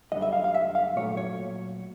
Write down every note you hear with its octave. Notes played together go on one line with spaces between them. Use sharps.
F#2 D3 G3 D#5
E5
F5
F5
E5
F5
A#2 F#3 A3 C#5
C#5